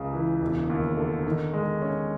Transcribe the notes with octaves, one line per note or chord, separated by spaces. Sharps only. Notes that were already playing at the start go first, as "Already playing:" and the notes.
Already playing: C#2 C#3
E3
E1
D#2
D3
D#3
G#3
C#4